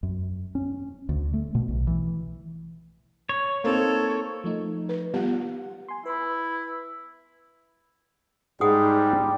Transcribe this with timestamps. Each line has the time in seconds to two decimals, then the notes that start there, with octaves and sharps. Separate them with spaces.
0.03 F#2
0.55 C#4
1.09 D2
1.33 A3
1.55 B2
1.68 B1
1.87 E3
3.29 C#5
3.64 A#3 C4 D#4 A4
4.44 F3 A3 D#4
4.89 B4
5.14 G3 B3 F4 G4 F#5
5.88 G#5 C6
6.06 E4 B4 B5
8.61 G#2 G3 G#4 F#5 D#6